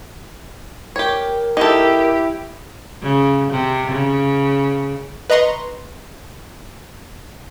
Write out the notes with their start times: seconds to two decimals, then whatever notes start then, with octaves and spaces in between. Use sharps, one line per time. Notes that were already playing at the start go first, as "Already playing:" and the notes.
0.96 G4 A#4 C#5
1.57 D#4 E4 G4 A4
3.02 C#3
3.51 C3
3.91 C#3
5.30 B4 D#5 A#5 C6 C#6